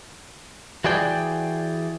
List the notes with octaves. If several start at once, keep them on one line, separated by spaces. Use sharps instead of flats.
E3 F#4 G#4 D5 G5